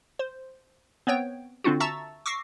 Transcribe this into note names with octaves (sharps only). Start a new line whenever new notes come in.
C5
B3 C4 C#5 G5
D3 C4 D4 F4 F#4
E5 A5 A#5 C#6 E6 A6
C#6 D6 E6 A#6 C7